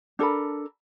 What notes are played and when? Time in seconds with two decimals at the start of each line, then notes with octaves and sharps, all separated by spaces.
0.19 D4 A4 A#4 B5